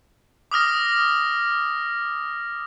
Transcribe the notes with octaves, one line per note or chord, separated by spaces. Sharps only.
D6 D#6 F6 A#6